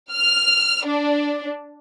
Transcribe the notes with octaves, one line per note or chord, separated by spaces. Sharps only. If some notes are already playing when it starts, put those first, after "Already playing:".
F6
D4